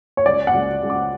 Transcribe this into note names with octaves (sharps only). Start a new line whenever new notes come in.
C#5
C#2 D5
F#5
C#2
C#2
D6